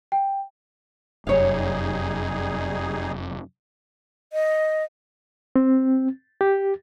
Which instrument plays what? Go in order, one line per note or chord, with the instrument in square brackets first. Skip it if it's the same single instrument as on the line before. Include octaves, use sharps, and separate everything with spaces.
[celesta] G5
[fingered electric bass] F1 F#2 [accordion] G3 D#4 G#4 [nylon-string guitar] C#5 F5
[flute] D#5
[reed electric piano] C4
G4